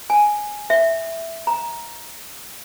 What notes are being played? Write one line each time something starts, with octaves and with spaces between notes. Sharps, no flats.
G#5
E5
A#5